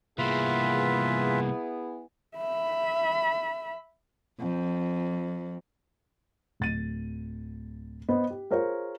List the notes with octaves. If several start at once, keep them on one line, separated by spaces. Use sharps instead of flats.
C2 A#3 B3 E4 F4 G#4 B4 E5
E5 B5
F2
D1 A6 D#7
B3 C5 D#5
G4
F4 G#4 A#4 C5 C#5